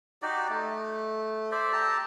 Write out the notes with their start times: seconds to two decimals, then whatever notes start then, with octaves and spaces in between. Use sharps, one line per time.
0.22 D#4 F#4 G4 D5
0.50 A3
1.52 C5 D5 E5
1.73 G4 A4 A5 A#5